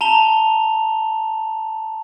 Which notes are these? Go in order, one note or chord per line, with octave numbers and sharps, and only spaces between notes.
A5 A#5 F7 G7